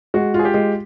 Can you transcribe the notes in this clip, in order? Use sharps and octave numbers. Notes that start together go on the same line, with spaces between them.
G#3 F#4
F4
G#4
G4
G#3